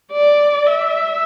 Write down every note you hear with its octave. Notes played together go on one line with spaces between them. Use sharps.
D5
E5